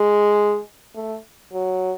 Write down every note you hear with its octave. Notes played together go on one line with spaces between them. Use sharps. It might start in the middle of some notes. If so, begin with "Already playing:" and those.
Already playing: G#3
A3
F#3